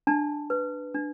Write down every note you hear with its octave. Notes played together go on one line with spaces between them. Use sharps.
D4 A5
B4
D4